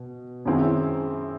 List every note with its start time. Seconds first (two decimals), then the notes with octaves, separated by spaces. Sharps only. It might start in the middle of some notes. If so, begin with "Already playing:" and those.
Already playing: B2
0.45 F#2 D#3 G#3 C4 E4